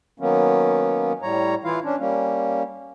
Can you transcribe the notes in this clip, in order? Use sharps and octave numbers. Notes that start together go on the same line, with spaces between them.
D#3 F#3 A#3 B3 C#4
A2 G3 C#5 A#5
E3 E4 F4 F5
C#4 D4
G3 A#3 C#4